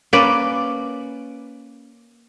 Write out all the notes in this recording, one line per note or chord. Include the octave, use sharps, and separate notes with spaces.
A#3 C#4 B4 D5